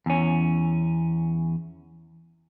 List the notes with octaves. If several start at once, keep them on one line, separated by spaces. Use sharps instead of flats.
E2 C#4